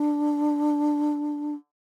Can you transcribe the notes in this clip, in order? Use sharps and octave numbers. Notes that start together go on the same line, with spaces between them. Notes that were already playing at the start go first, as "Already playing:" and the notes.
Already playing: D4